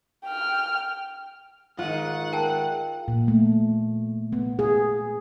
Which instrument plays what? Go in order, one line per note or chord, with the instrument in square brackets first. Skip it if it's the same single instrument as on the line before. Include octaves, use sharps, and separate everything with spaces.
[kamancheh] G5 F6
[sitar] G#2 D#3 [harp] F4 D#7 [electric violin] F#5
[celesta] A#4 G5 A5
[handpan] A#2
A3
B3
G#4